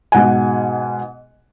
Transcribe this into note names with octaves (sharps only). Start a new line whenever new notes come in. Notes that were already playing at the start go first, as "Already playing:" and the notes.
G#2 B2 F#5 G#5